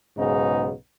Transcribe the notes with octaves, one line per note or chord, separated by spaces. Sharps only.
B1 G#2 C#3 B3 D#4